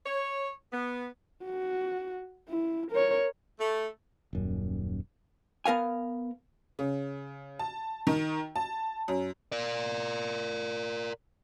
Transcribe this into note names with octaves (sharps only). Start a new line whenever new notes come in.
C#5
B3
F#4
E4
A#4 C#5
A3
D#1 F#2
B3 A#4 F5 G#5
C#3
A5
D#3
A5
F#2
A#4 D5